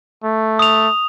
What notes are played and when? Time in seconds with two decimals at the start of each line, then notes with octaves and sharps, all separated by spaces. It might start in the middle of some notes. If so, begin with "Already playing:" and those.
0.24 A3
0.59 D#6 F7